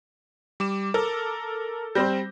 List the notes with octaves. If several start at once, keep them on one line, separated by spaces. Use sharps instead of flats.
G3 D6 E7
A4 A#4
G3 C4 C5 G6 A#6